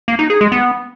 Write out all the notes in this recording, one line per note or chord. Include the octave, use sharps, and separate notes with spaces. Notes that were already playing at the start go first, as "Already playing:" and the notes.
A#3
D#4
G#4
G#3
B3